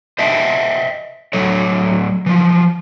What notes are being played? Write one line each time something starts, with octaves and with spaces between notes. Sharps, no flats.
C5 D#5 E5 G5 A5
A2 F#3 A4 C#5
E3 F3